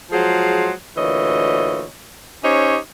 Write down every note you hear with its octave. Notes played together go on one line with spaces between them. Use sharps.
F3 F#3 G#3 G#4 C5
D2 A#2 E3 C#5 D#5
C#4 D#4 G4 C5 C#5